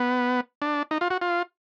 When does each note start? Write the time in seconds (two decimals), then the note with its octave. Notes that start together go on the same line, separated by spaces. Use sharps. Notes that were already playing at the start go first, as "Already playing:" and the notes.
Already playing: B3
0.62 D4
0.91 D#4
1.01 F4
1.10 F#4
1.22 F4